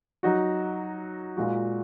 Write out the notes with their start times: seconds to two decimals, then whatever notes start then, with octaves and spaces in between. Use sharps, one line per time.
0.23 F#3 D#4 F#4
1.37 A#2 G#3 F#4